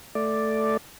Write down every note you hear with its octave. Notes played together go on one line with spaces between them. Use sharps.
A3 D5